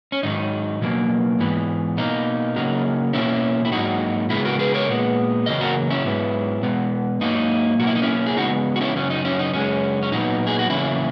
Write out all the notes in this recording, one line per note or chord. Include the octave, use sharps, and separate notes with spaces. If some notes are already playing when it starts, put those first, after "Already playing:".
C#4
G#2 D#3 F#3 D#4
B2 F#3 A#3
G#2 E3 B3
B2 A#3 D#4
C#3 F#3 A#3
B2 A#3 C#4 E4
E4
G#2 F#3 A#3 D#4 F#4
C#3 G#3 B3 E4 G#4
F#4 A#4
G#4 B4
A#4 C#5
A#2 G#3 B3
E2 C#3 F#3 A#3 D#5
F#4 A#4
C#4 E4
G#2 F#3 B3
B2 G#3 B3
G#2 F#3 A#3 D#4
B2 F#3 A#3 F#4
E4
D#4
C#4 E4
G#4
C#3 G#3 B3 D#4 F#4
F#4
C#4 E4
F#2 C#3 F#3 C#4
D#4
C#4 E4
D#4
F#2 C#3 G#3 C#4
C#4
A#2 F#3 B3 D#4
G#4
F#4
E2 C#3 F#3 A#3 C#4 E4